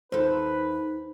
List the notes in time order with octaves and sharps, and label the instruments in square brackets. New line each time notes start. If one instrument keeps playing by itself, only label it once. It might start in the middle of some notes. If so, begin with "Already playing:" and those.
[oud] D#2 A4 [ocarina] D#4 [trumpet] B4 [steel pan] C5